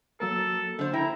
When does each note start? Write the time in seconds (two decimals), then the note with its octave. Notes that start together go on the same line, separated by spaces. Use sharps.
0.20 F#3 A#3 A4 A#4
0.79 D3 C5
0.94 E4 E5 G5 A#5